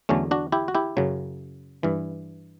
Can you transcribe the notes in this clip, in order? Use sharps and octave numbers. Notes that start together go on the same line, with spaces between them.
E2 D3 F#3 A3 C#4
D4 F#4
E4 G4
F#4
E4 G4
F#2 C#3 F#3
G2 E3